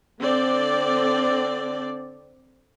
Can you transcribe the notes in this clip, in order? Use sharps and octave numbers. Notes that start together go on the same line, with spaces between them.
D3 C4 D5